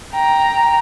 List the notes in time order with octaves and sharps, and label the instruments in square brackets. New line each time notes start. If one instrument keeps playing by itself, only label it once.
[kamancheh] G5 A#5